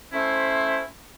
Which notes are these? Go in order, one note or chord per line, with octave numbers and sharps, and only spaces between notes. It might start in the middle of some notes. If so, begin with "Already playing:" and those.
A3 C#4 E4 C5